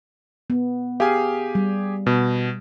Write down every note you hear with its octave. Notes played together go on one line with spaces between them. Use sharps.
B3
G4 G#4 F5 G#5
G3
B2